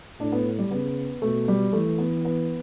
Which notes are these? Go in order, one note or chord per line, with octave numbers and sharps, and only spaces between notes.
A2 D4
B3
G3
C#3 B3
B2 A3
G3
E3 A3
B3
B3